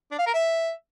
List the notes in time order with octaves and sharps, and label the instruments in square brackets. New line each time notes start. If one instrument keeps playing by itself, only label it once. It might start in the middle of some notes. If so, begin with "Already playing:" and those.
[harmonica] D4
F5
A#4
E5